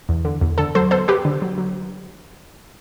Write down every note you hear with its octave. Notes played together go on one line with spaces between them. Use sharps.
E2
D3
E2
D3 A4
F#3 A4 C5
B3 A4 C5
F#3 G4 B4
D3
F#3
F#3